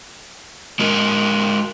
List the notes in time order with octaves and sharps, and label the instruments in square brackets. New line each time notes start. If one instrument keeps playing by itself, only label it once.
[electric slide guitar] G#3 F#4 A#4